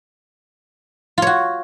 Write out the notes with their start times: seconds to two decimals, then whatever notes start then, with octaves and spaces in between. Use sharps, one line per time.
1.18 F4
1.22 C#5
1.27 F#4